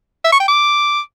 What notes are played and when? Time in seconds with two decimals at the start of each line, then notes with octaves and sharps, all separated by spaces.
0.24 E5
0.32 C#6
0.40 G5
0.48 D6